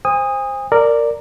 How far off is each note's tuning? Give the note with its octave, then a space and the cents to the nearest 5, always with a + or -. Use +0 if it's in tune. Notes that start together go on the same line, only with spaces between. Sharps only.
C5 +0 G#5 -40 D#6 +0
A#4 -15 D5 +0